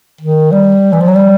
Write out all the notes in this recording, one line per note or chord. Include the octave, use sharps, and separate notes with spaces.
D#3
G3
E3
F3
F#3
G3